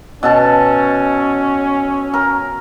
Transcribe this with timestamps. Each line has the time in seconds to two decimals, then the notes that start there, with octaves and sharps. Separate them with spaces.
0.23 B2 C#4 A4 A5
2.14 A#4